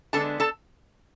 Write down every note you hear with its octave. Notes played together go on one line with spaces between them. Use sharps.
D3 G#3 B3 D4 A4 A5
A4 A5